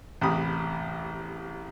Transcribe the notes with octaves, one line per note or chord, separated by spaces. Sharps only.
A1 E2 C3 G4 B5 D#6